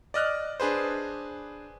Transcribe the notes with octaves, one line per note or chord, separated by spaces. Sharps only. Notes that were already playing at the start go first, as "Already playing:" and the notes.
D5 D#5 F6 F#6
D4 G#4 B4 C5